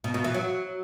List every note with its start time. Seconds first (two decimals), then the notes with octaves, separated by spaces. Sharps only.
0.04 B2
0.14 B2
0.24 E3
0.34 F#3